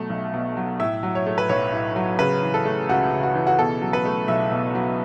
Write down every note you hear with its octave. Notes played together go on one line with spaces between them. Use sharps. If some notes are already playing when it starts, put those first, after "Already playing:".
Already playing: B2 F#3 A3
B1
B2
F#3
A2 E5
F#3
C#5
A3
B4
B1 C#5
A2
F#3
C#3 B4
E3
A4
A3
C#2 F#4
C#3
F#4
E3
F#4
B2 A4
F#3
B4
A3
B1 E5
B2
F#3